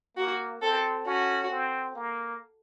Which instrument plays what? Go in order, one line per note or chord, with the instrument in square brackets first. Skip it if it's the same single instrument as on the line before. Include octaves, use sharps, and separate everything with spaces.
[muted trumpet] A#3 [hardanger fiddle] F#4
[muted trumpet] C4 [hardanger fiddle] A4
[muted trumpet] C#4 [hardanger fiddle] F#4
[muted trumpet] C4
A#3